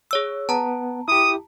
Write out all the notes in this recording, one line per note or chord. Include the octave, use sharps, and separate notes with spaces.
G#4 C#5 E6
B3 A5 A#5
E4 G4 D#6